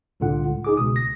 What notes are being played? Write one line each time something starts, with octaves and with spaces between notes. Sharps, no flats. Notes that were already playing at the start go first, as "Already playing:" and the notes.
C2 A2 D3 F4 F#5
C#2
D#4 G#4 D6
G1 C#2 B2 D#6
A#6